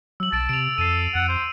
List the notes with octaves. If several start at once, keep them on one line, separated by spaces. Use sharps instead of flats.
F#3 E6 F#7
B1 A5 A6 D7 F#7
C3 D7 F7
F2 A4 C7 D#7
F2 F#5 A6
C5